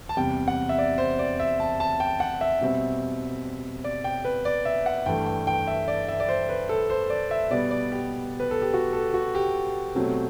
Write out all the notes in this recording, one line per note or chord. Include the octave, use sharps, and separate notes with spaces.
A5
E2 C3 G3 G5
F#5
E5
D5
C5
D5
E5
A5
A5
G5
F#5
E5
B2 G3 C4
D5
G5
B4
D5
E5
F#5
G2 E3 A3 G5
G5
G5
E5
D5
E5
D5
C5
B4
A4
C5
D5
E5
B2 G3 B3 D5
D5
G4
B4
A4
G4
F#4
A4
F#4
G4
B2 F#3 A3 C4